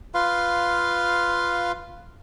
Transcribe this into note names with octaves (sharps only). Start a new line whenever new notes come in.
F4 B4 F5 C6